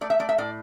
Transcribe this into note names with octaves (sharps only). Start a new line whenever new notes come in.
A3 D5
E5
A3 D5
E5
A2 D5